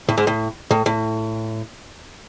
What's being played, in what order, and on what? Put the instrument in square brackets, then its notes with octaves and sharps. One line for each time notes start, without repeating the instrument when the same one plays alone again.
[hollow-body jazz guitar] A2
G#2
A2
A2
A2